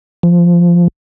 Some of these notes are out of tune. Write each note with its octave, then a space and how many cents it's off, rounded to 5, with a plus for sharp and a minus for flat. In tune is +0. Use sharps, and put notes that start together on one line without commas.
F3 -10